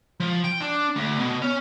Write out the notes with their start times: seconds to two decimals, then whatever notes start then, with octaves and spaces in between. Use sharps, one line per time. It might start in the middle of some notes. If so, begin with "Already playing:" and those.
0.20 F3
0.44 G5
0.60 D4
0.96 D2
1.19 B2
1.42 C#4